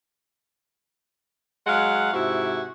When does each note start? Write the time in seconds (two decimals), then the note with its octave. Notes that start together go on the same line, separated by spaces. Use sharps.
1.67 F#3 G#3 F5 F#5
2.14 G#2 C3 E4 F#4